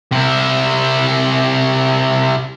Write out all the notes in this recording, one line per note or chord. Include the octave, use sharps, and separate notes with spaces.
C3 E4